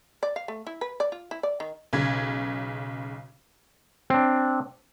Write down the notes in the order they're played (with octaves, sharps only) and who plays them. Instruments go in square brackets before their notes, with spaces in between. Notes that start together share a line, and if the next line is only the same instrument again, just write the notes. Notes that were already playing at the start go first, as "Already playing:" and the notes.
[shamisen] D5
F5
A3
E4
B4
D5
F4
E4
D5
D#3
[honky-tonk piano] B1 C#3 G#6
[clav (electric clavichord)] C4 D4